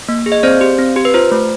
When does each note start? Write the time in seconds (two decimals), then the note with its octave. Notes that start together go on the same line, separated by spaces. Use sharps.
0.09 A#3
0.26 G#4
0.32 D#5
0.43 C4 C5 D5
0.61 G4
0.79 C4
0.96 G4
1.05 B4
1.14 F4 C5
1.31 A3